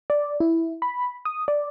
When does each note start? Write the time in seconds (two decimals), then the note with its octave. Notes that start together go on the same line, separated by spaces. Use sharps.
0.10 D5
0.40 E4
0.82 B5
1.25 D#6
1.48 D5